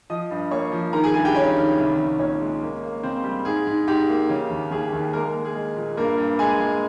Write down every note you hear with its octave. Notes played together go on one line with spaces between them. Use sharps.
F3 D#5 D#6
G2
A#3 C#5 C#6
F3
D#3 A#4 A#5
G#4 G#5
G2 G#4 G#5
G4 G5
G2 C#4 C#5
D#3
C2
C2
A#2 C#4 C#5
G#3
A#3
A#3
C#3 C4 C5
G3
G#2 G#4
G#2
G#2 G4
A#3
C#3
D#2
D#2 G#4
D#2
G#3 A#3 A#4
A#3 A#4
G#3
G#4
G#3
A#2
G2 A#3 A#4
G2
G#3 G#4 G#5
G#3